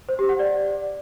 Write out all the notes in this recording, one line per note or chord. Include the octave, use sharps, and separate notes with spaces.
C5
G4
F#5
D5